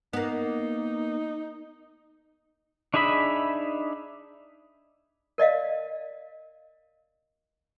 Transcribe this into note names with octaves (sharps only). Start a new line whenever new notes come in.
A#3 B3 D#4
D4 D#4 G#4 E5 B5
A#4 D5 D#5 F5